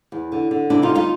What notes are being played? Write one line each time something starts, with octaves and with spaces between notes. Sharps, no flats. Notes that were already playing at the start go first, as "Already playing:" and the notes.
E2
D3
D3
C3 D4 E4
D#4 F4
G3
D#4 F4